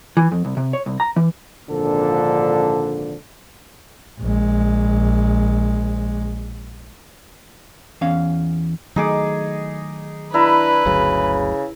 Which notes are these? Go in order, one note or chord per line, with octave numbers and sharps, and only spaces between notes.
E3
F2
C2
C3
C#5
C2
A#5
E3
G#1 A#2 D3 F3 D4 A4
A#1 G#3
E2 C#4 F5
D#3 F#3 A3 D#4 G#4 D6
D4 E4 B4 A#5
G1 D2 C#3 F#3